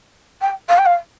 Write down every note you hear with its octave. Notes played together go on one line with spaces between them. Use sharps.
G5
F5
G5
F5